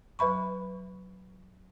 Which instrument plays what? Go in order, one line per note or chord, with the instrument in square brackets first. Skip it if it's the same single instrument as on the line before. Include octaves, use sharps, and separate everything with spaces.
[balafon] F#3 B4 E5 B5 C#6